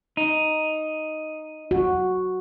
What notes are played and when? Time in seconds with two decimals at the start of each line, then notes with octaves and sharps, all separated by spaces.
0.17 D#4
1.71 F#4